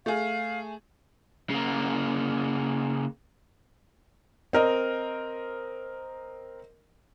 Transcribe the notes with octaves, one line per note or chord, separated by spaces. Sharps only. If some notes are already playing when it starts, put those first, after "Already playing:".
A3 G#4 F5
C#3 A#3
C4 A#4 D#5